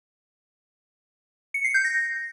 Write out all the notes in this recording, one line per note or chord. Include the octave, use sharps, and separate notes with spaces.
C#7
C7
G6
A#6